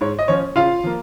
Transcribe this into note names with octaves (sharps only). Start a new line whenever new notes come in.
G#2 C#5
D#5
F3 C#4 C#5
C#3 F4 F5
F3 A#3